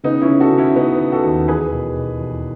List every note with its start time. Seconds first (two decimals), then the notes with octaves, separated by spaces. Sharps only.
0.04 C#3 B3 D#4
0.22 C#4 E4
0.29 C#3
0.40 F#4 A4
0.52 C#3
0.58 C#4 E4
0.76 C#3 B3 D#4
1.01 C#3
1.12 F#4 A4
1.24 D#2
1.48 E2 G#4 B4
1.72 B2
1.97 B2
2.20 E2